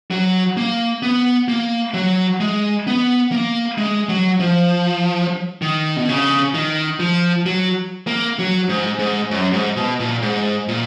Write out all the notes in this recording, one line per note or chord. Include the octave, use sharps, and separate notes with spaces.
F#3
A#3
B3
A#3
F#3
G#3
B3
A#3
G#3
F#3
F3
D#3
B2
C#3
D#3
F3
F#3
A#3
F#3
G#2
G#2
F#2
G#2
B2
A#2
G#2
A#2